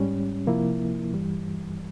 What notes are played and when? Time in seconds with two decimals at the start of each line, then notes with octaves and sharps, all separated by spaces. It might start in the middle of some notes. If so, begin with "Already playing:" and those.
Already playing: G#2 G3 C#4
0.47 C3 F3 A#3 E4
1.13 G2 E3 G3